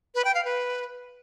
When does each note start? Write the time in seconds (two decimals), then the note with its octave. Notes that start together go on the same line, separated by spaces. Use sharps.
0.15 B4
0.25 G5
0.35 F5
0.45 B4